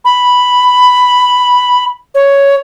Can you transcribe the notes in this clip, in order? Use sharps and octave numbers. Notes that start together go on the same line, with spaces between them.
B5
C#5